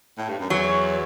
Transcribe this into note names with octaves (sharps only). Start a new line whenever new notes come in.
A2
G2
F#2
E2 F#3